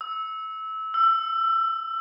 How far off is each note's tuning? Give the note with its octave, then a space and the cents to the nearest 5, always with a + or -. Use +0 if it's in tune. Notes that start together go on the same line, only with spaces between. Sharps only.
E6 -20
E6 +25